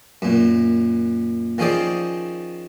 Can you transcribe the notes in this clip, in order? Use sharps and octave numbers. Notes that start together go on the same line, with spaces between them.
F#2 A#2
D#3 F3 C#4 G#4 C5 D5